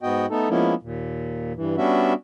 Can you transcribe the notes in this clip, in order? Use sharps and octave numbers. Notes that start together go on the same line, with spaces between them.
G#2 B3 F#4 D#5 G5
A3 B3 D#4 A4
F3 G#3 A#3 B3 C#4 E4
D#2 A#2
G2 E3
G3 B3 C#4 D4 F#4 E5